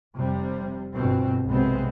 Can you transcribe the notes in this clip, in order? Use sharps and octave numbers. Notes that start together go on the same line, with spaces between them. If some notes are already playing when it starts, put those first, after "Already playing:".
F1 C3 G3
G1 G2 B2 C4
B1 C3 G#3 B3 C4